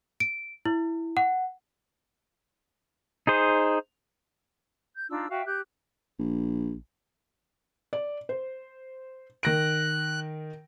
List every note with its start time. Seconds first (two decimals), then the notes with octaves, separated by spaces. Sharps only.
0.20 D7
0.65 E4
1.17 F#5
3.27 D#4 G#4 C5
4.95 G6
5.09 D4 D#4 F4 E6
5.29 F#4 E5 F5 G5
5.45 G4 F#6 G6
6.19 A#1
7.93 D5
8.29 C5
9.43 D#3 F#6 A#6 D7